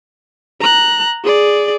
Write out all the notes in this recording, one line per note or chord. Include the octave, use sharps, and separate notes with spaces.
A#5 F#6
G#4 D5